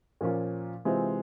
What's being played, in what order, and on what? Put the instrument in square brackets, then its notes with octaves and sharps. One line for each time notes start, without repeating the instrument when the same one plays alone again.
[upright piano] A#2 F3 A#3 C#4 F4
C3 E3 G#3 C4 F4